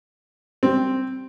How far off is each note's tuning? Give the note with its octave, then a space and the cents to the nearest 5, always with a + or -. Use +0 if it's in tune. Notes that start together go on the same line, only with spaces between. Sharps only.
G3 -15 C4 +0